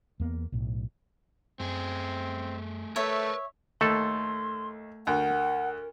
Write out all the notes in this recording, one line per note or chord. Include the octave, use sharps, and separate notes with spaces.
E2 A#3 B3
B1 A2
F#2 A3 C4 G#4
A3 A#4 B4 C#5 E5
D#2 A3 A4 C6
D2 A#4 F#5